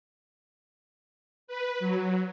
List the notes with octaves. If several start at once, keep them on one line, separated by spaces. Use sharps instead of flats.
B4
F#3